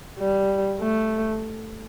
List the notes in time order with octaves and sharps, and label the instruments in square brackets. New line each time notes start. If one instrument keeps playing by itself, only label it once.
[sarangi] G3
A3